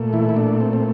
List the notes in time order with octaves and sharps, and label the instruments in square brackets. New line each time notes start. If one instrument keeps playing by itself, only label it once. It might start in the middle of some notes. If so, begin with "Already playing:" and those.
Already playing: [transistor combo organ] A#2 A3
E3 E4
E4
D4
C4
C4